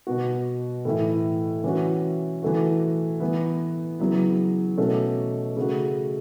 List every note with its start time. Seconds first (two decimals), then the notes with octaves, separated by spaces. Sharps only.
0.07 B2 B3 F#4
0.85 A2 E3 A3 E4
1.64 E3 C#4 F#4
2.43 E3 A3 F#4
3.20 E3 B3 E4
3.99 C#3 F#3 B3 E4
4.78 B2 A3 C#4 F#4
5.56 C#3 A3 F#4